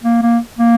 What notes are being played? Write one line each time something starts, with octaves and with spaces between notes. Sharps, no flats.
A#3
A#3
A#3